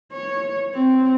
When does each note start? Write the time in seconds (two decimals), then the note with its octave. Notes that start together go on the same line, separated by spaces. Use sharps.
0.12 C#5
0.74 C4